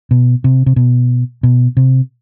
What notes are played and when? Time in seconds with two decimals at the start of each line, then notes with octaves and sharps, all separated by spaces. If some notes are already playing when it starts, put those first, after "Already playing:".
0.11 B2
0.44 C3
0.66 C3
0.76 B2
1.43 B2
1.77 C3